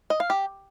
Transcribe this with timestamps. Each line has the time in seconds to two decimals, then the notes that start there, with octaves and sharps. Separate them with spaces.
0.10 D#5
0.20 F5
0.30 G4